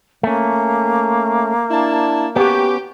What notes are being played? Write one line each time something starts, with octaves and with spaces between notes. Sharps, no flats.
A3 A#3 C#4
D4 E4 A5
B3 C#4 F#4 G4